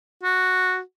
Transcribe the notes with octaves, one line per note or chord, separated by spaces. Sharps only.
F#4